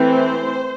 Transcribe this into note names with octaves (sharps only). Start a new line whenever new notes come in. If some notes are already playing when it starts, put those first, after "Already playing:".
Already playing: E3 A3 C4
C5